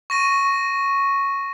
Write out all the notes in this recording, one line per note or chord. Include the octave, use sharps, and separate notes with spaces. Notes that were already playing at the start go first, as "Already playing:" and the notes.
C#6 A#6 D#7